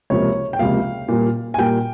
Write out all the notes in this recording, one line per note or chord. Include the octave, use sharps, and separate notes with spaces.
C#2 C3 F3 A#3 C#5
G5
C#2 C3 F3 A#3 F5
A#2 G3 A#3
G#5
A#2 G3 A#3 G5